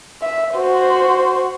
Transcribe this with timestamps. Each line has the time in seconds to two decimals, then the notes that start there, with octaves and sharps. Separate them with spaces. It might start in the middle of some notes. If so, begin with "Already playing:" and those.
0.22 E5
0.55 F#4 C5